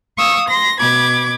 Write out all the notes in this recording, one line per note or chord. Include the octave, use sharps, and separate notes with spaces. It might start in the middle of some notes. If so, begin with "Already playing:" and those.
F5 C#6 D#6 E6
C6 A#6
B2 B5 D6 G#6